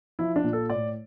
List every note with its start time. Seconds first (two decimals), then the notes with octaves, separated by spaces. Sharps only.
0.19 F3 E4
0.36 D4
0.44 A#2
0.53 A4
0.70 A2 D5